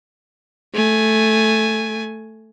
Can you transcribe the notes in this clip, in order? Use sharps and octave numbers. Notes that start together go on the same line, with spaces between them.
A3 G#5